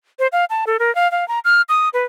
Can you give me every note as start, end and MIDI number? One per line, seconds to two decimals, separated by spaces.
0.19 0.27 72
0.32 0.45 77
0.50 0.65 81
0.67 0.77 69
0.79 0.93 70
0.95 1.10 77
1.12 1.27 77
1.28 1.39 82
1.45 1.62 89
1.69 1.89 87
1.94 2.05 71